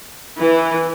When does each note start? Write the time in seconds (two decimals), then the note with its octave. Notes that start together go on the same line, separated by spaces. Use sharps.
0.38 E3